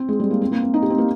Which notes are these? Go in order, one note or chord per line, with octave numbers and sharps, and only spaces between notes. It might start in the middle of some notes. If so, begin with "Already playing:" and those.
Already playing: C4
G#3
G3
A#3
C4
A#3
C4
D#4
G4
C4
A#3